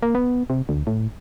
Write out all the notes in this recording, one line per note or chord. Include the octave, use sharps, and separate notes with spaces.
A#3
B3
C3
D2
A2